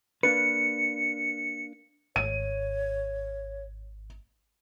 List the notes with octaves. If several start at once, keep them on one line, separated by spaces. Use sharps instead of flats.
A#3 D4 B4 C#7
G#1 C#5 D#7